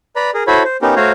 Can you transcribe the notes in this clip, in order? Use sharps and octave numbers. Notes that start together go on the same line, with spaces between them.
B4 D5 A#5 B5
G#4 A#4
E4 F#4 A4 C5 C#5 B5
C5
B3 C#4 D#4 G4 A#4
A3 F#4 C5 C#5 F5 A#5